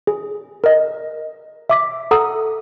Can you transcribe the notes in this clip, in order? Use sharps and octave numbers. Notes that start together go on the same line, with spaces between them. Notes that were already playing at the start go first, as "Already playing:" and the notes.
G#4
A#4 D#5
E5 D6 B6
A4 F#5 A#5 D#6